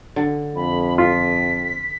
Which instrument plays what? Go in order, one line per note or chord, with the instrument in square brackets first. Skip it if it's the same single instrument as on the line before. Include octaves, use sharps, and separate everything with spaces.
[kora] D3
[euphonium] F2 [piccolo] B5
[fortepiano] F4 [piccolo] B6